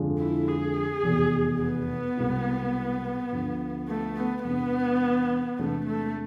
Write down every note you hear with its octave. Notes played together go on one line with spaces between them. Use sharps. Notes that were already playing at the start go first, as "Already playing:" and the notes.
Already playing: F2 D3 G#3 D4 F4
E4
G#4
F1 E2 B2
B3
C2 B2 G#3 C4 E4
D2 D3 F3
A3
B3
E2 C3 E3 G#3 B3 D4
E2 C3 E3 G#3 A3 D4
A3